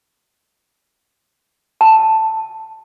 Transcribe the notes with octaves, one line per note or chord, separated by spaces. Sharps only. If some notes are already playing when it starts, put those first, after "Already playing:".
A5